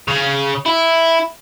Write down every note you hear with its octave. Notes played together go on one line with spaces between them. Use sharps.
C#3
E4